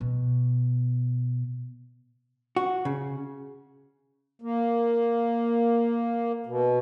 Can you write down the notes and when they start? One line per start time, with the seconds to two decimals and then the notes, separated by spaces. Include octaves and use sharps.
0.01 B2
2.56 F#4
2.85 C#3
4.42 A#3
6.46 B2